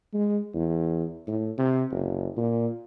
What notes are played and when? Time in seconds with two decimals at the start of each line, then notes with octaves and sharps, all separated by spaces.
0.14 G#3
0.55 E2
1.28 A2
1.58 C3
1.91 F#1
2.37 A#2